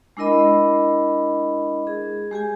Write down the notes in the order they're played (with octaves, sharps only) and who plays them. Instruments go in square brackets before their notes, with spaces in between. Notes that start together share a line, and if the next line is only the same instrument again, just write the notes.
[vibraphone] G#3 D4 E4 A#4 D#5 B5
G#4
G#3 G4 G#4 G#5